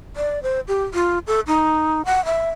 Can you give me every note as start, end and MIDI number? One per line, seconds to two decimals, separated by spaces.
0.16 0.42 74
0.43 0.60 72
0.68 0.84 67
0.94 1.19 65
1.27 1.40 69
1.47 2.02 63
2.05 2.24 78
2.25 2.50 76